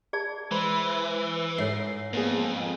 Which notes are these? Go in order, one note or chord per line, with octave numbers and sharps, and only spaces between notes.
G#4 D5 A5
E3 G#3 B4 C5
G#2 A4 C#5 E5 C7
F2 A#3 B3 G#4